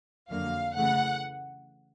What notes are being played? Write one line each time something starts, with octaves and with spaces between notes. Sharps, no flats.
F2 D3 F#3 A#3 F5
C#3 E3 A3 F#5